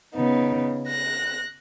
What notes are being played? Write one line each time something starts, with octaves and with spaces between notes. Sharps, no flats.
C#3 B3 D#4
F#6 A#6